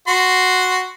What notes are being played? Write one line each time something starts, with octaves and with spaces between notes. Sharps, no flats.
F#4 C6